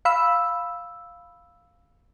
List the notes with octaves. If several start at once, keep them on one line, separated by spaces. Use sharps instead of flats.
F5 B5 E6